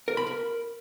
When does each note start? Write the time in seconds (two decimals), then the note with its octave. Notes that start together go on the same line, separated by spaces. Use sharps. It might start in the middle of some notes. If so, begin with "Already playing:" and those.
0.08 A#4
0.17 B5
0.27 A#4